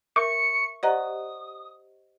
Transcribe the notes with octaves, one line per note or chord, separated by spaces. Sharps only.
A#4 E5 C#6 C#7
G4 C5 D5 D#5 F#5 A#5 D#6